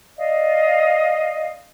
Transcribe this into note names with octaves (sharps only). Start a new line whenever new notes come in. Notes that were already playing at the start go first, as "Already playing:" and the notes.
D5 D#5 F5